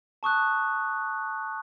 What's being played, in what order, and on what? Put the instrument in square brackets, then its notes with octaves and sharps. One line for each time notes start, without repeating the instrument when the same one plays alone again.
[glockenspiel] A5 C#6 D#6 F#6